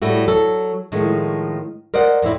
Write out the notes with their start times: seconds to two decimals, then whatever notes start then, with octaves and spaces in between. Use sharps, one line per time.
0.02 A2 G3 A3 F#4
0.28 F#3 A4
0.92 A2 D#3 F3 G#3 A3
1.94 A#4 C5 D5 D#5 F#5
2.22 F2 A2 C4 E4